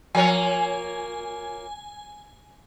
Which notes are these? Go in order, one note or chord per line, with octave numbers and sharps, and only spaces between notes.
F3 A#3 C#5 G#5